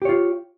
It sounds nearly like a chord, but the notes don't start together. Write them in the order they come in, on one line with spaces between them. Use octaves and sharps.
G4 C#5 F4